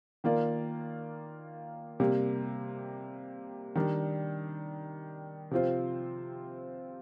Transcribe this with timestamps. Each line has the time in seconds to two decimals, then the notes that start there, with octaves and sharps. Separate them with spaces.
0.24 D#3 A#3 F4 A#4 D5
2.00 C3 G3 A#3
3.75 D#3 G3 D4
5.51 C3 F3 C4 F4 C5